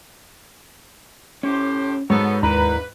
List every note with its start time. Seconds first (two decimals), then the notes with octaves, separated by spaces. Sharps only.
1.43 A2 C#4 G4 C5
2.10 G#2 B3 F#4 A4 C#5
2.43 D#2 D4 E4 A#4 B4 A#5 B5